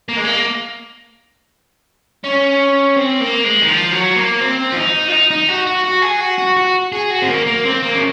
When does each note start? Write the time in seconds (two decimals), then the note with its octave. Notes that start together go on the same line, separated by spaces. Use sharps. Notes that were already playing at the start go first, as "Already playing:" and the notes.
0.08 A#3
0.16 G#3
0.25 A#3
2.24 C#4
2.97 C4
3.20 A#3
3.44 G#3
3.62 D#3
3.69 F3
3.93 F#3
4.16 A#3
4.40 C4
4.72 F4
4.76 D#4
5.08 F4
5.13 D#4
5.31 D#4
5.49 F#4
5.67 F#4
5.84 F#4
6.02 G#4
6.21 F#4
6.39 F#4
6.57 F#4
6.92 G#4
7.11 F#4
7.22 C4
7.28 A#3
7.46 A#3
7.65 C4
7.83 A#3
7.95 C#3